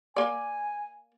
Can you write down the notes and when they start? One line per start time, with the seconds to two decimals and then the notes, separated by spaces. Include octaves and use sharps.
0.16 A#3 D5 G#5